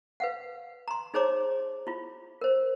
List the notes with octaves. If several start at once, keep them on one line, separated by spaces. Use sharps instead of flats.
B4 F5 F#5
A#5 C6
D#4 G#4 C5 C#5 A#5 D6
E4 F4
A#4 C5